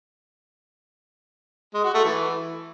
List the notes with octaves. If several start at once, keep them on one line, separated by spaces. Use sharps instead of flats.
G#3
F#4
A3
E3